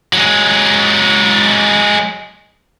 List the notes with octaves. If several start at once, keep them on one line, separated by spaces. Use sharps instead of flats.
F#3 G#3